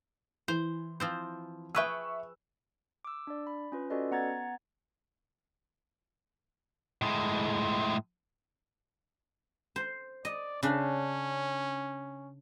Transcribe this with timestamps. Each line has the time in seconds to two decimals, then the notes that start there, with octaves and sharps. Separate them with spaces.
0.48 E3 C5
1.00 F3 C4 C5
1.75 G#4 B4 E5 G5 C#6 E6
3.05 D6 E6
3.27 D4 D5
3.47 B5
3.72 C#4 F4 B4
3.90 C#4 F#4 A4 B4 D5 D#5
4.11 B3 F#5 A#5 G#6 A6
7.02 A2 G#3
9.76 C5
10.25 D5 D#5
10.63 C#3 C#4 D4